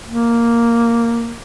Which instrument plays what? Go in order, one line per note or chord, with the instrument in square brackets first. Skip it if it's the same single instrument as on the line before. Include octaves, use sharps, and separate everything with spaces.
[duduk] A#3